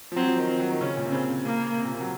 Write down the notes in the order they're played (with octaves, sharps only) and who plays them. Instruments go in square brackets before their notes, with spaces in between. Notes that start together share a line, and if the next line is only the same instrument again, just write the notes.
[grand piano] F3
[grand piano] F#3 [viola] C4
[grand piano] F3
D#3
[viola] C4
[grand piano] F#3
D#3
[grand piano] C#3 [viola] C#4
[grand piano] A#2
C3
[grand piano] C#3 [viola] C4
[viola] A#3
[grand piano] C3
A#2
C3
F#3